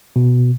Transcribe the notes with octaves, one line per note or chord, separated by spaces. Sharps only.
B2